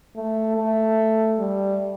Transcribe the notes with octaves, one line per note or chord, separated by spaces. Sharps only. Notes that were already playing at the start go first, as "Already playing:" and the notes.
A3
A3
G3